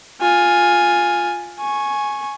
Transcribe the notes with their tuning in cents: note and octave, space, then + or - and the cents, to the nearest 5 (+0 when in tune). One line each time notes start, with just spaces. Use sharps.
F4 +10 G#5 +0
G#5 +10 C#6 -15